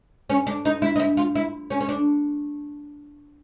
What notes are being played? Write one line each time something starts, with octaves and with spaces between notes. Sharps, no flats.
C#4
D4
D#4
E4
D#4
E4
F4
E4
C#4
C#4
D4